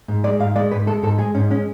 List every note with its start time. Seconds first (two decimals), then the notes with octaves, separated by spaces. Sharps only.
0.08 G#2
0.24 G#3 D5
0.40 G#2 F5
0.56 G#3 D5
0.71 G#2 B4
0.87 G#3 A4
1.03 G#2 A4
1.18 G#3 G#4
1.35 G#2 C#4
1.50 G#3 C#4